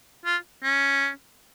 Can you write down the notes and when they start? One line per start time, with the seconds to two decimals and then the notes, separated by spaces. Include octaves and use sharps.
0.25 F4
0.63 C#4